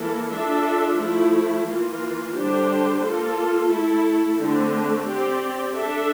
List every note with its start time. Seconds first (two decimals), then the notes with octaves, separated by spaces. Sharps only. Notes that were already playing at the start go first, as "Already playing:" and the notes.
Already playing: E3 A#3 E4 A4
0.30 D4 F4 A4 E5
0.97 F3 A3 E4
1.66 E3 A#3 F4
2.34 D3 G3 D4 G4 C5
3.01 A#3 F4 A4
3.69 A3 E4 A4
4.37 D3 A3 C4
5.05 C4 G4 D5
5.74 D4 A4 E5